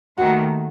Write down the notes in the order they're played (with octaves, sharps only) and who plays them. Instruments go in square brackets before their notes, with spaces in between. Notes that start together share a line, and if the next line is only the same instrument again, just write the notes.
[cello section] D#2 D#3 A3 [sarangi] F#4